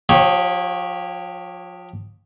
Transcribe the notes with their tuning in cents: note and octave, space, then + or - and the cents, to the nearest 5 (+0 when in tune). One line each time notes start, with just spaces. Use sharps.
F3 +30 G4 +0 C#5 -15